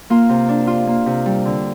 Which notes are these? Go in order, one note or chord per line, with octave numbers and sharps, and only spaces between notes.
A#3 F4
C3
D4
F4
A#3
C3
G3
D3